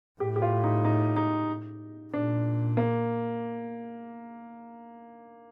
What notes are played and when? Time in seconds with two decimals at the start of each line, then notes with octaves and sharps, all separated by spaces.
0.20 A2 G4
0.36 G4
0.42 F4
0.64 D#4
0.84 D#4
1.16 D#4
2.13 A#2 D4
2.77 A#3